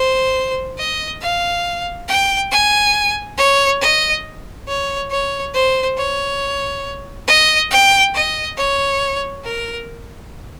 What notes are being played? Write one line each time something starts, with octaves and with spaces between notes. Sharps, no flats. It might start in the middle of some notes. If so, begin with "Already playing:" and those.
Already playing: C5
D#5
F5
G5
G#5
C#5
D#5
C#5
C#5
C5
C#5
D#5
G5
D#5
C#5
A#4